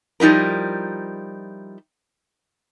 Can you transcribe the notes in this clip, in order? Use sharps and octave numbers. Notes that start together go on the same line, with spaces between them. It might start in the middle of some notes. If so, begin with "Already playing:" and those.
F3 G3 D#4 E4 A#4